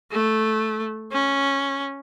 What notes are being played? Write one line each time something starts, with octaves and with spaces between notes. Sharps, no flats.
A3
C#4